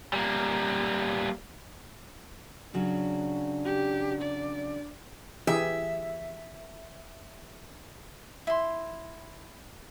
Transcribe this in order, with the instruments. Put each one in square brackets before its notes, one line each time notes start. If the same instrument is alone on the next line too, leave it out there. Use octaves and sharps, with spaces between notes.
[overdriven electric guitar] G3 A#3
[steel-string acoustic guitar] C#3 F#3 F#4 [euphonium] D4
[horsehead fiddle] G4
D5
[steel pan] E3 G4 G#4 [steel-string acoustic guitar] E5
[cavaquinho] E4 C6